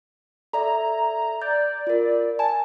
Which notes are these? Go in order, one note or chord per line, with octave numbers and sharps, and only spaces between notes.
A4 D5 E5 A#5
D5 G6
F4 A#4
G#5 A5